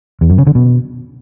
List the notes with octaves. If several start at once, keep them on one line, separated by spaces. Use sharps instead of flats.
E2
F#2
C#3
D3
B2